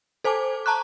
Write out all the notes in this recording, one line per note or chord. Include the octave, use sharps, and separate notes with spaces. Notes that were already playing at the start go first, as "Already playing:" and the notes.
A4 C5 G#5 A5 D6
A5 A#5 C#6 F#6